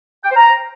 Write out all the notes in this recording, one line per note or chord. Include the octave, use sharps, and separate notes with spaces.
G5
C5
A#5